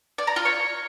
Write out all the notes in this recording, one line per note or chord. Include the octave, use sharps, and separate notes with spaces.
D5
A#5
F4
C#5